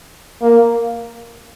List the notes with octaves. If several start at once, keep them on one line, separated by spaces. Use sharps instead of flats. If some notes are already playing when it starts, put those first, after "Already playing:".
A#3